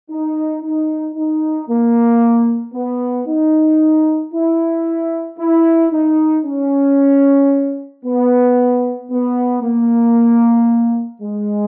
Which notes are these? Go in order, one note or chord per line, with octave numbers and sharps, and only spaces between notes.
D#4
D#4
D#4
A#3
B3
D#4
E4
E4
D#4
C#4
B3
B3
A#3
G#3